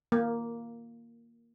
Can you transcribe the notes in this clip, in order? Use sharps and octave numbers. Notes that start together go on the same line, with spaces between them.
A#3